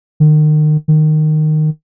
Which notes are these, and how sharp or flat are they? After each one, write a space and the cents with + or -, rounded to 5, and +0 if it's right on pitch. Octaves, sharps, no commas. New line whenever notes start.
D#3 -35
D#3 -15